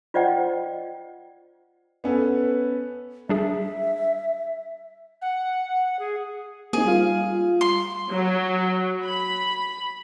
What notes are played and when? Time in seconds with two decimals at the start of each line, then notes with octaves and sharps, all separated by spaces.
0.14 F4 C5 D5 D#5 F#5 G5
2.04 B3 C#4 A4 B4
3.29 G3 D4 G#4 E5
5.22 F#5
5.99 G#4
6.73 A#3 C4 D#4 G#4
6.85 G3 F4 F5
7.61 C6
8.11 F#3
9.03 B5